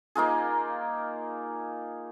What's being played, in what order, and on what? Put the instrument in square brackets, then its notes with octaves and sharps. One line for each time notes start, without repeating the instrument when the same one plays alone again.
[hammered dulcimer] A#3 D#4 F4 G#4